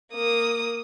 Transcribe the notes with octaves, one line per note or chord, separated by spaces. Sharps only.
A#3 D#6